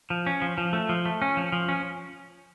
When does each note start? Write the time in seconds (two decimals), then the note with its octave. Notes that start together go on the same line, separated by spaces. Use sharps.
0.10 F3
0.26 C#4
0.42 F3
0.58 F3
0.73 A3
0.89 F3
1.06 A3
1.22 C#4
1.37 F3
1.52 F3
1.69 C#4